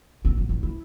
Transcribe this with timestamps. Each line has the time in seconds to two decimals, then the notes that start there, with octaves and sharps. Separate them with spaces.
0.25 C4
0.38 G#1
0.49 E2
0.63 E4